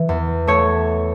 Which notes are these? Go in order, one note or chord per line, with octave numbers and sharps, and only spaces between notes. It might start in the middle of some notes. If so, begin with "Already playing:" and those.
Already playing: E3
E2
A3 C#5